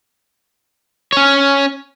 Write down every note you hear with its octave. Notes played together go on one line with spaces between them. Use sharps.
C#4 C#5